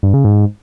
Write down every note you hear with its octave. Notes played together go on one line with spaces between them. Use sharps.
G2
C#3
G#2